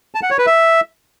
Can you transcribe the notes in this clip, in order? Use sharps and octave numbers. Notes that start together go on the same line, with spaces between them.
A5
F#5
C#5
B4
E5